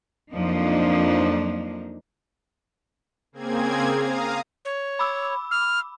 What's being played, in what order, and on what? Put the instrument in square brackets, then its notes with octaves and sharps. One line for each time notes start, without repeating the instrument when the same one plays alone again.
[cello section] F2 F3 F#3 A#3 D4 D#4
[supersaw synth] C#3 A#3 C4 G#4 G#6
F5 A#5 D#6
[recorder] C#5
[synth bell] B5 D6 E6
[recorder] F6